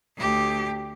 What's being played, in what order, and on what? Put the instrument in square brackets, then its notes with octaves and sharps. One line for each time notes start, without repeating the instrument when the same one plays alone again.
[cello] D2 G4